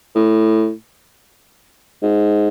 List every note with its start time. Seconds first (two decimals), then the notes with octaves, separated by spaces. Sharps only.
0.15 A2
2.02 G#2